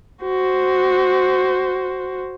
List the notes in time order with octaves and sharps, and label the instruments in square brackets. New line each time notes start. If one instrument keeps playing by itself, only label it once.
[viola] F#4 C5